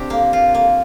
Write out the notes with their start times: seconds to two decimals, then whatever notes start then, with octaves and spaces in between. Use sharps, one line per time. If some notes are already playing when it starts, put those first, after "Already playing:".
Already playing: C4 D4 G4
0.10 A#3
0.33 F4
0.54 A#3